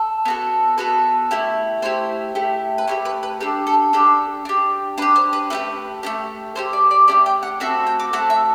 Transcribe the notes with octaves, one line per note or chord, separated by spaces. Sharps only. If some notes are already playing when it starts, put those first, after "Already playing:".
Already playing: A4
B3 F#4 A4
B3 F#4 A4 B4
A3 E4 G4
A3 E4 G4 C5
A3 E4 G4
B4
A3 E4 G4 C5
B4
B4
D4 G4 A4
A4
D4 G4 A4
D4 G4
D4 G4 B4
C5
B4
A3 D4 G4 B4
A3 D4 G4
A3 D4 G4 C5
D5
D5
A3 D4 G4 D5
G5
F#5
A3 C4 F#4 A4 E5
G5
D6
A3 C4 F#4 A4 F#5
E5